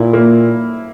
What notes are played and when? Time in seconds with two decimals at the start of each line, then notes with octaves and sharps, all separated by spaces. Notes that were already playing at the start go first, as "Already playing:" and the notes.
Already playing: A#2 E4
0.13 A#3